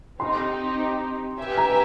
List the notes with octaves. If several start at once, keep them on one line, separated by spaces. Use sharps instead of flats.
C4 D#4 G4 C6
G4 B4 E5 G#5
A#5